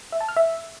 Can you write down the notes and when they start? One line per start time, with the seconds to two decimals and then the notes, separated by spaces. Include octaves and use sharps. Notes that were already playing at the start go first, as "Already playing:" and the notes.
0.12 E5
0.20 A5
0.28 F6
0.37 E5